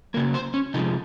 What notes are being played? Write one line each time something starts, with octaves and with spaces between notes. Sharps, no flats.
C#3 F#3 A#3 A#4
C5
C#4
C3 F3 G#3 D#4